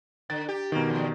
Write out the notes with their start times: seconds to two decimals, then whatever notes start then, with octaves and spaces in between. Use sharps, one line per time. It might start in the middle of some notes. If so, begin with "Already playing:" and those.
0.30 D3 A6
0.48 G4
0.72 B2 D#3 A#3
0.89 E2